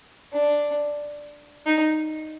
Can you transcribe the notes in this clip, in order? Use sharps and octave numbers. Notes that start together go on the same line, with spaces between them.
D4
D#4